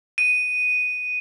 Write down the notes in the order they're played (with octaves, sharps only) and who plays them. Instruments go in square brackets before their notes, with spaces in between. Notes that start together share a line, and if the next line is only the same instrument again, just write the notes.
[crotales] D#7